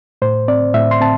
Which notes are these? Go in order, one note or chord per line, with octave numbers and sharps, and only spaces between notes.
A2 C5
C4 D5
A2 E5
C6
C4 A5